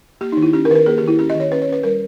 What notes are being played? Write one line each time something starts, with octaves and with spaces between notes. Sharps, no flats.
A#3 G4
D#3 D#4
E4
C#4 G4
A#4
D#3 B4
A#4
A#3 G#4
G4
D#3 E4
C#4 G4
D#5
D#3 C#5
C#4 B4
C#5
C#4 B4
G3 A#4